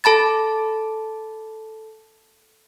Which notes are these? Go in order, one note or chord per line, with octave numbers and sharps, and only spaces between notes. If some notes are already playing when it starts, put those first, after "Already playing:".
A4 A5 B5 A6